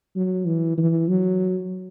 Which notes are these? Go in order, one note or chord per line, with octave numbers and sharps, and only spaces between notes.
F#3
E3
E3
F#3